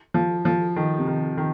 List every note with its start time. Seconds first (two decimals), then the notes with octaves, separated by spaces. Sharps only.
0.14 F3
0.45 F3
0.76 D#3
0.98 C3
1.07 D#3
1.37 D#3